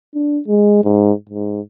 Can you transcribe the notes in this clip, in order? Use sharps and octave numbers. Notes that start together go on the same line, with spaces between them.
D4
G#3
G#2
G#2